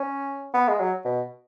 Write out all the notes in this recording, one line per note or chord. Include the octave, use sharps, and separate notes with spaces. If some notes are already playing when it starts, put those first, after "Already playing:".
Already playing: C#4
B3
G#3
F#3
B2